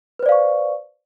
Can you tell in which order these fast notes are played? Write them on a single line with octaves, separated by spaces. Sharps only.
B4 C5 D5 F5 C#6